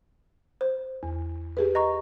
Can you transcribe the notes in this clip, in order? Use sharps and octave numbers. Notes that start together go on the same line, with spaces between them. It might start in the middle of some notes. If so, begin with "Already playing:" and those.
C5
E2
G4 G#4 B4
D#5 A#5 C#6